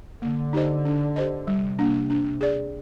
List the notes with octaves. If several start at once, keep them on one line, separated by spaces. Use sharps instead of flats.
D3 A#3
D#4 G4 C5 D#5
D4
G4 C5 D#5
C3 G3
A#3 D4
D4
G#4 D5